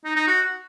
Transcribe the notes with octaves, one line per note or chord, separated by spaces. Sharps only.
D#4
D#4
F#4